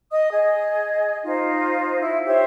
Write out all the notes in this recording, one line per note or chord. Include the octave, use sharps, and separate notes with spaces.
D#5 D#6
G#4 D#5
D#4 F4 C5
E4
G4 C5 C#5 E5